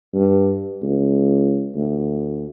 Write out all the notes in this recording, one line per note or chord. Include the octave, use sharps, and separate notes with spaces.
G2
C#2
D2